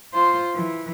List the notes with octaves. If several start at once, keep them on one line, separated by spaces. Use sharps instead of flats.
F4 C5
E3